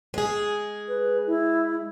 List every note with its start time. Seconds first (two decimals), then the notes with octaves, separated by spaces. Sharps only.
0.14 G#3 G#4
0.88 B4
1.27 E4